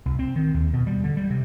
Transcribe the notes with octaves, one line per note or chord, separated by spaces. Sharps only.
C2
C4
D#3
D#2
B2
G3
D3
G3
C3